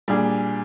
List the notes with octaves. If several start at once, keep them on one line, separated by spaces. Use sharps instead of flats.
A#2 G3 D4 G#4